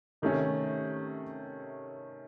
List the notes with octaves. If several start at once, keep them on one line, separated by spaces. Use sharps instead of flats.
C3 D#3 A3 C#4